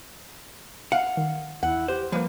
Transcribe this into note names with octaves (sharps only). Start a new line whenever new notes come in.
F5 F#5
D#3
E2 E4 F#5
G4 C5
F3 G3 A#3 B4